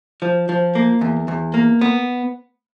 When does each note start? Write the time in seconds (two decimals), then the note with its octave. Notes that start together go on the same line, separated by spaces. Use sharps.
0.22 F3
0.49 F3
0.75 A#3
1.01 E2
1.28 E2
1.54 A#3
1.81 B3